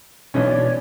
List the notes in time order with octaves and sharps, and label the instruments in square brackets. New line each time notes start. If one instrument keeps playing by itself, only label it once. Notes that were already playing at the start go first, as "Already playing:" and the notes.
[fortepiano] B1 E3 C#4 [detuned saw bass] B2 [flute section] D4 C#5
[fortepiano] D5